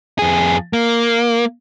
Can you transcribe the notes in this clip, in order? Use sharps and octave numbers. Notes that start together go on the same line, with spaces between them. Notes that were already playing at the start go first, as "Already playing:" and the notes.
F2 G#4
A#3